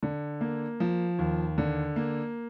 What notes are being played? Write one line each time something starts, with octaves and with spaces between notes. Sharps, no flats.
D3
A#3
F3
D#2
D3
A#3